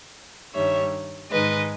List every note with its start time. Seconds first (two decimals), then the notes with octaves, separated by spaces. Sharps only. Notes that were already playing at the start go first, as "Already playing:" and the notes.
0.54 G2 D#3 G3 C#5 E5
1.31 G#2 D#3 G#3 B4 D#5